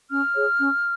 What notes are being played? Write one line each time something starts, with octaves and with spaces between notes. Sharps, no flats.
C#4 F6
G#4 C#5
C#4